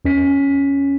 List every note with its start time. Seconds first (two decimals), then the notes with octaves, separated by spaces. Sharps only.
0.05 E2 C#4 B6